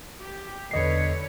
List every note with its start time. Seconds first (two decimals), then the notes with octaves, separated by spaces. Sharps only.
0.20 G4
0.71 E2 D3 B4 C#5 D#5 C7